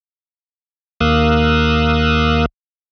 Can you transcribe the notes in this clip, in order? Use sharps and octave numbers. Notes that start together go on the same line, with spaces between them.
D#2 A#3 F5 D#6 E6 F#6